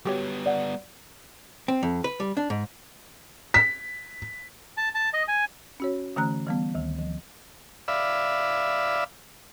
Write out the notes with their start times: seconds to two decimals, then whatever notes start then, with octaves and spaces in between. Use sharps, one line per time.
0.05 G3 B3 F#4 G4 C#5
0.46 D5 F#5
1.68 C4
1.83 F2
2.04 B4
2.20 G3
2.37 D4
2.50 G#2
3.54 B6
4.77 A5
4.95 A5
5.13 D#5
5.28 G#5
5.80 C#4 F#4 C#5
6.16 D3 E3 A3 C#4 A#5 F#6
6.46 E3 G3 B3
6.75 D2 D#3
6.99 F3
7.88 D5 E5 F5 B5 E6